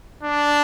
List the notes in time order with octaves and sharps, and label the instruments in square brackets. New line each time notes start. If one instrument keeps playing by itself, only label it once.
[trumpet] D4